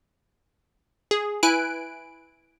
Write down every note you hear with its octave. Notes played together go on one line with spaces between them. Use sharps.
G#4
E4 B4 G#5 F#6 D7